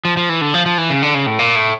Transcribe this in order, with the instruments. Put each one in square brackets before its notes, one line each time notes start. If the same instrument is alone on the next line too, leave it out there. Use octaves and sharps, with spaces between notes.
[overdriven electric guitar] F3
F3
E3
D3
F3
F3
E3
C#3
D3
C#3
A2
A#2
A2